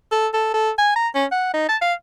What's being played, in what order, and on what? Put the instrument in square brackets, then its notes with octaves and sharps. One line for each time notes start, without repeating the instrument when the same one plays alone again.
[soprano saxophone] A4
A4
A4
G#5
A#5
C#4
F#5
D#4
A5
F5